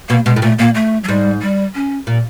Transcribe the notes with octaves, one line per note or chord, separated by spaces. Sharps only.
B2 A#3
B2 G#3
A2
A#2 A3
A#2 A#3
A3
F#3
G#2 G3
G3
C#4
A#2